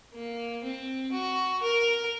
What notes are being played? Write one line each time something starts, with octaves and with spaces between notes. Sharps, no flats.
A#3
C4
F#4
A#4